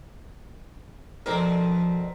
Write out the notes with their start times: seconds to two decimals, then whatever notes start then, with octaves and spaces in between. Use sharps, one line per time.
1.26 B2 F3 C4 D4 A4 A#4